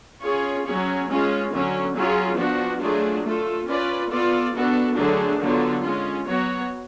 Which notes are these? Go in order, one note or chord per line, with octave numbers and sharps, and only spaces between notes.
C#4 F4 G#4 C#5
F#3 C#4 G#4 C#5
G#3 C#4 F4
D3 F#3 C#4
F#3 C#4 F4 G#4
F3 B3 D4 F#4
F#3 A3 D4 F4 G#4
A3 F4 A4
C#4 F4 B4 D5
B3 F4 A4 D5
B3 D4 F#4 A4
D3 F#3 A3 D4 G#4
D3 F#3 B3 F4
G#3 C#4 F4
F#3 B3 F#4 C#5